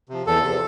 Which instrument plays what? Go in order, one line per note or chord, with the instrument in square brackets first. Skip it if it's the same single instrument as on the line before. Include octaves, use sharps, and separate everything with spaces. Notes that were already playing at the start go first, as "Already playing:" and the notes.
[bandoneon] C3 F3
E2 A4
C3 F3